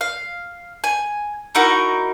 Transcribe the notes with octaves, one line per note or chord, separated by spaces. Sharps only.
F5
G#5
D#4 E4 F#4 A#4